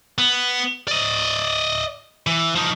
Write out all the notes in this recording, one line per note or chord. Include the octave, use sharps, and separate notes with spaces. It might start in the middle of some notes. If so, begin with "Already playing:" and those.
B3
D5 D#5
E3
F3 D#4